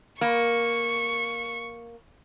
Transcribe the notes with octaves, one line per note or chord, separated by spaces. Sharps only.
A#3 C#6